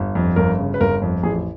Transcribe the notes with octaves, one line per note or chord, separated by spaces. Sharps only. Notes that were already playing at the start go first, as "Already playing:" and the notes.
Already playing: G1
F2
G1 A#4
C#3
B4
G1 A#4
F2
A1 G#4